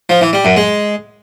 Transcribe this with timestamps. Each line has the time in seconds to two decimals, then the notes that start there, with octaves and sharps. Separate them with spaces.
0.09 F3
0.21 E3
0.33 G3
0.45 F#2
0.57 G#3